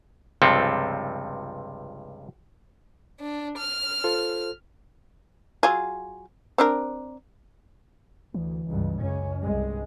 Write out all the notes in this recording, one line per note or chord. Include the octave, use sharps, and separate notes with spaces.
C#2 G2 C3 F3 C4 A4
D4
F6
F4 A4 C5
F#3 F4 G#4
C4 D4 A#4
D2 E3
C#2 G2
C#2 F#2 C#4
C2 G2 G#3